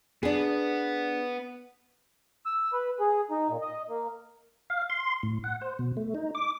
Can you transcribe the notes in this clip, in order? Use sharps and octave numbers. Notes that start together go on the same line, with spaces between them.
B3 D4 G#4
E6
B4
G#4
D#4
A#2
D#5
A#3
F5
C6
A2
F#5
C5
B2
A3
D#4
D6